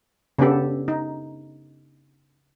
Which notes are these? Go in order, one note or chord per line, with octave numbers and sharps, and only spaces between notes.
C#3 B3 D4 G4 A4
D#4